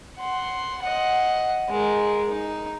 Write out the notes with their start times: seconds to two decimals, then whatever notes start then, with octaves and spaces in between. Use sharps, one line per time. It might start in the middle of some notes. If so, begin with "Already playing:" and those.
0.18 F#5 C6
0.83 D#5 F#5
1.69 G#3 A#4
2.28 D#4